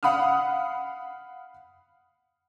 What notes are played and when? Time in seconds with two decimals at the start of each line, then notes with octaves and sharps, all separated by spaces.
0.03 F5 F#5 B5 D#6 F6